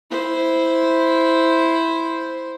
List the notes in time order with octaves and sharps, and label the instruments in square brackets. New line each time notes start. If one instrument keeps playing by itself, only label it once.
[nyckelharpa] E4 C5